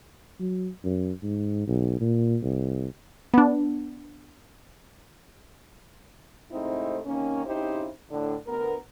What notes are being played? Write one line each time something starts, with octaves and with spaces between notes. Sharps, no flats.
F#3
F#2
G#2
B1
A#2
C2
B3 D4
G#2 C3 A3 C4 D#4 E4
C3 D#3 A#3 C#4
C#3 C4 D#4 E4 G4 C5
A2 D3 D4
D2 B3 A#4